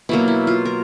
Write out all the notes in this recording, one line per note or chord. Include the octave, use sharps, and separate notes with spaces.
B2 F#3 A#3 E4
E4
F4
A#4